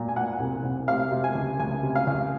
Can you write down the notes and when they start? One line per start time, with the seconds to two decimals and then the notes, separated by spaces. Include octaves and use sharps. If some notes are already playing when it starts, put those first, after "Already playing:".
Already playing: A#2 F#3
0.08 G#5
0.16 A#2 F#5
0.40 C2
0.64 C2
0.88 C3 F5
1.12 C3
1.24 G#5
1.35 C#2
1.59 C#2 G#5
1.83 C3
1.95 F5
2.07 C#2